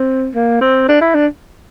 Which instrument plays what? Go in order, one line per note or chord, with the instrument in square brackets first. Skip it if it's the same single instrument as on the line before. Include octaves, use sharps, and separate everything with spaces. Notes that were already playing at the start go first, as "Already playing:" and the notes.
Already playing: [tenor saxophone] C4
A#3
C4
D4
E4
D4